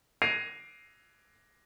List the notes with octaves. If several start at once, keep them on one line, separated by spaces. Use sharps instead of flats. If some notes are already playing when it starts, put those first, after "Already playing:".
G#6 A#6 C7 D7 D#7 F7